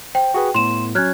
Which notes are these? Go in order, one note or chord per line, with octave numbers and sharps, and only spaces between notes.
C5 G5
F#4 G#4 B4
A2 B3 C6 E7
F#3 C#4 F6 F#6 G#6